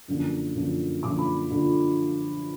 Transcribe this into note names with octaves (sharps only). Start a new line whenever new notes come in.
F#2 D3 F3 A#3
F#2 D3 F3 A#3
F#2 D3 F3 A#3 D6
B5
D3 F4